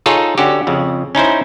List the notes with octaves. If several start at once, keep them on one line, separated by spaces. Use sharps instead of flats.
D#4 F4 G#4 A4 C#5
D3 C#4 F#4 G4
F2 C#3
C#4 D#4 E4 C5